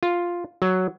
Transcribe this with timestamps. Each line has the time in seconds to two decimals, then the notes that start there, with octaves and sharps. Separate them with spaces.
0.03 F4
0.62 F#3